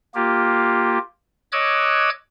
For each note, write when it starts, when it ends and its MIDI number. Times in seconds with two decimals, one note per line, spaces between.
0.15 0.98 58
0.15 0.98 65
0.15 0.98 67
1.52 2.10 73
1.52 2.10 75
1.52 2.10 86
1.52 2.10 88
1.52 2.10 90
1.52 2.10 92